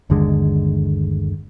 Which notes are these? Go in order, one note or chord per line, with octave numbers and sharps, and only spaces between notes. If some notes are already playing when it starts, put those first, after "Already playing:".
G1 D#2 D3 G#3